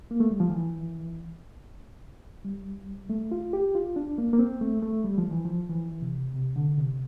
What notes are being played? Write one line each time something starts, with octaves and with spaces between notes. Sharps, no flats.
A#3
A3
G3
F3
E3
G3
A3
F4
G4
F4
D4
A#3
A#3
C4
A3
A3
G3
F3
E3
F3
E3
C3
C3
D3
C3